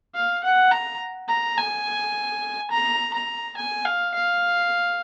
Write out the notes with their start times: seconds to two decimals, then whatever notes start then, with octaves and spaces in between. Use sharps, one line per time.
0.15 F5
0.44 F#5
0.72 A#5
1.29 A#5
1.58 G#5
2.71 A#5
3.14 A#5
3.57 G#5
3.85 F5
4.14 F5